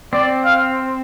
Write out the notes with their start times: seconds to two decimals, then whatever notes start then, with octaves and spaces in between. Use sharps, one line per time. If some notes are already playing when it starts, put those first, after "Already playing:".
0.13 C4 D5
0.45 F5